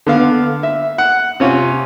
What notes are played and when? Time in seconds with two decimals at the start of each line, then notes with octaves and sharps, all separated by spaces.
0.06 D3 B3 F5
0.63 E5
0.98 F#5
1.40 C3 C#4 F4